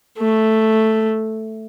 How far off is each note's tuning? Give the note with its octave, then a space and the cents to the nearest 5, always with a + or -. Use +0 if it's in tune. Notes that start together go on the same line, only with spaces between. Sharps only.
A3 +0